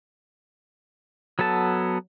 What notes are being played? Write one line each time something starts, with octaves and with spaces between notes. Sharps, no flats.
F#3 B3 A4 A5